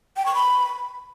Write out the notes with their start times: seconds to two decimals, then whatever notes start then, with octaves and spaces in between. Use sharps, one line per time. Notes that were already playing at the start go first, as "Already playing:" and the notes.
0.17 G5
0.26 C#6
0.35 B5